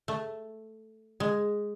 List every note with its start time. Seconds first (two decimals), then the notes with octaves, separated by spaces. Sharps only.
0.08 A3
1.20 G#3